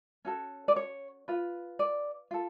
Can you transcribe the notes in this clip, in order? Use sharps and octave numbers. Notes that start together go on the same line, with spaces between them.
C#4 F#4 A4
D5
C#5
F4 B4
D5
F4 A4